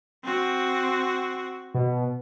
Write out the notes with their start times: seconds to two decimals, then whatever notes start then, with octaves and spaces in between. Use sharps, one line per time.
0.24 C4 F#4
1.74 B2